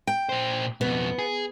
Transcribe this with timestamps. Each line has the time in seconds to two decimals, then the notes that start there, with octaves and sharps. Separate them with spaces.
0.07 G5
0.29 A#2 C5
0.81 F2 B2 B3
1.18 G#4